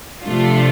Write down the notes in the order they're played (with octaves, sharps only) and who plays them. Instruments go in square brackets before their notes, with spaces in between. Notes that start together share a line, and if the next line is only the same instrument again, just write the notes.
[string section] C3 F3 A3 D4 F4